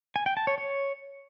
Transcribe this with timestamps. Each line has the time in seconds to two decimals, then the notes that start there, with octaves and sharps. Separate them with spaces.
0.16 G#5
0.26 G5
0.37 A5
0.47 C#5
0.58 C#5